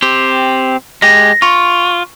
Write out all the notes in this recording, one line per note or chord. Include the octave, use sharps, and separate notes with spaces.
C4 G4
G#3 G4 A#6
F4 C#6